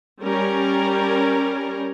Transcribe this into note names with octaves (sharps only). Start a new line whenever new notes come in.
G3 C#4 A#4